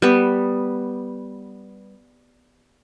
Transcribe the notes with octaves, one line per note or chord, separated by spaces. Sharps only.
G3 B3